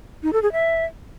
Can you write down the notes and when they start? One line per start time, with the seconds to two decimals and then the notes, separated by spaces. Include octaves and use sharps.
0.23 D#4
0.33 A4
0.43 G#4
0.52 E5